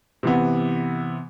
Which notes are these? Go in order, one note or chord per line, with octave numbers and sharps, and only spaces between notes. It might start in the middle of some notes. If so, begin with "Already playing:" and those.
C3 E3 B3